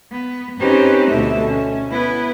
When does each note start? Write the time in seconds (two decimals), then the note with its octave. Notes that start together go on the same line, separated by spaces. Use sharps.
0.12 B3
0.59 C4 C#4 D#4 G4 B4 C5
1.09 D2 B2 A4 E5
1.46 C#4
1.90 B3 E4 B4